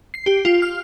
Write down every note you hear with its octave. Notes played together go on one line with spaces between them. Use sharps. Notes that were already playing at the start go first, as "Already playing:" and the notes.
C7
G4
F4
F6